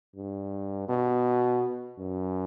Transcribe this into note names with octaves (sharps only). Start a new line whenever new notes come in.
G2
B2
F#2